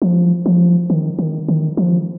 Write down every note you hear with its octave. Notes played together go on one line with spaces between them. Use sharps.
F3
F3
D#3
D#3
D#3
F3